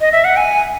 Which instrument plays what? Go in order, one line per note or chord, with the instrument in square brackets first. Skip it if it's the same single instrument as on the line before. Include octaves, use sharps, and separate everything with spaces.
[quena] D#5
E5
F#5
G#5